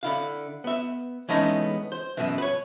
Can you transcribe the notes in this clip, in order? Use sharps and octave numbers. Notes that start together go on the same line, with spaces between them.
D3 E4 F5
B3 E5
E3 G#3 A3 B3 C#4 D#4
C5
F#2 B2 E3
B4 C#5